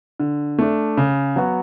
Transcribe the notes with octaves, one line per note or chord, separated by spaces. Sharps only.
D3
A3 D4
C#3
F#3 B3 F#4